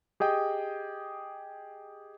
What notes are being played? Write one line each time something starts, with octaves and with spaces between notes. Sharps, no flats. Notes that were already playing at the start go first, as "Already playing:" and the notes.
G4 G#4 D#5 G5